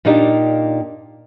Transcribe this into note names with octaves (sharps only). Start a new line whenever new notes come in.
A#2 A#3 D4 D#4 G4